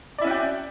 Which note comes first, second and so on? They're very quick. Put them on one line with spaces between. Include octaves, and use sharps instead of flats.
D5 E4 C#4 F#4 G5